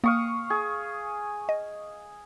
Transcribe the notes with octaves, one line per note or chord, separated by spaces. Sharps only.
A#3 F5 C#6 D#6
G#4
D#5